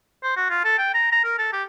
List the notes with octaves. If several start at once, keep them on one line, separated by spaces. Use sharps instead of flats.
C5
F#4
F4
A4
G5
A#5
A#5
A#4
A4
G4